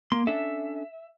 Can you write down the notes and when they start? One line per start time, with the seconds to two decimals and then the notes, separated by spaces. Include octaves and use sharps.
0.12 A#3 C6
0.27 C#4 D4 A4 E5